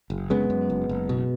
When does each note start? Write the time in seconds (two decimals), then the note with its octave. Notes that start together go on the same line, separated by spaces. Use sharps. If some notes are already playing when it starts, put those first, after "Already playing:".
0.10 F#1
0.30 C#3 G#3 B3
0.50 F#2
0.70 F#1
0.89 F#1
1.09 B2